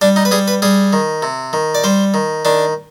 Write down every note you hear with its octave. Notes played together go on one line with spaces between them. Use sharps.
G3 D4
D#4
B4
G3 G#4
B4
G3 G#4
D#3
C3
D#3
D5
G3 C5
D#3
D#3 D4